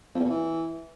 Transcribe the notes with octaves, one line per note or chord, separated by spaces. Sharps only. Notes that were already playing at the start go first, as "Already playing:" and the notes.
F2
E2
B2
E3